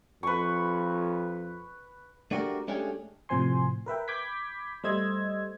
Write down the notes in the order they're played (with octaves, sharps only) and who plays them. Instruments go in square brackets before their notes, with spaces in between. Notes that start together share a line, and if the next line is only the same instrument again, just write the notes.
[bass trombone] F2 [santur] B4 C#6
[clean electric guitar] A3 D4 F#4 G4 A#4 D5
G#3 A3 C#4 D4 G4 G#4
[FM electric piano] A2 C3 F3 C5 G#5 C6
A#4 B4 E5 G5
B5 D6 G6 G#6 B6
G3 A3 C5 D#5 E6 G#6